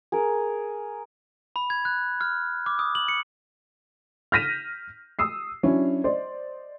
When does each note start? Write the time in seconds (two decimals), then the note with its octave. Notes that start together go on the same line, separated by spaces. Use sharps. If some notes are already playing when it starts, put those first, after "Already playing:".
0.12 G#4 A#4
1.56 B5
1.70 G#6
1.85 F#6
2.21 F6
2.66 D6
2.79 D#6
2.95 F#7
3.08 C#7
4.32 F6 G6 A#6 B6 D#7 E7
5.19 D#6 E6 C7
5.63 F#3 C#4 D4 E4
6.04 C5 D5 D#5